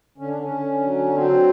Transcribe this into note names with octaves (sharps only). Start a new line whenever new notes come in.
D3 C#4
D4
C#4
D3
F#3
F#3 C4